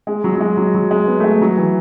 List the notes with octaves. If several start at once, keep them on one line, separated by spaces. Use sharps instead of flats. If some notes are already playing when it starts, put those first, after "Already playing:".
G#3
F#3
F#3
G#3
F#3
F#3
G#3
B3
A3
G#3
F#3
E3